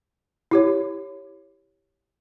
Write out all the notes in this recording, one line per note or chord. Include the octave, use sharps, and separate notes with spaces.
E4 G4 C#5